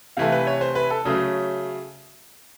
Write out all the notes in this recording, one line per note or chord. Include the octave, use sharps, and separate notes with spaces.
C3 E3 A3 F5
B4
C#5
C5
B4
A4
C#3 F#3 A3 G#4